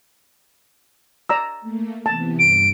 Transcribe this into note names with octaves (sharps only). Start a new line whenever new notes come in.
D5 A#5 E6
A3 A#3
C3 E3 B3 A5
G2 D7